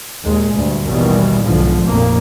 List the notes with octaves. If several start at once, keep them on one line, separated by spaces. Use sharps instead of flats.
D#2 A#2 G#3
D2 G2
A1 D#2 B2 D#3 E3 G3
B1 E2 G#2 D3 F3
A1 F2 A#2 A#3